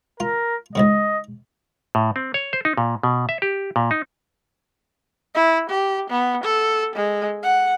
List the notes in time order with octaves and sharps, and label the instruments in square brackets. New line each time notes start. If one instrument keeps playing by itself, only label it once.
[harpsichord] F4 [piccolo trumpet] A#4
[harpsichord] C#2 G#2 C#3 [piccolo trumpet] D#5
[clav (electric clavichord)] A2
C4
C#5
C5
D#4
A#2
B2
E5
G4
A#2
D#4
[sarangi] E4
G4
B3
A4
G#3
F#5